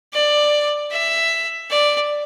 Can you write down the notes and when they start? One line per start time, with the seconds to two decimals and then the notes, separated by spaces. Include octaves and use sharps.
0.13 D5
0.91 E5
1.70 D5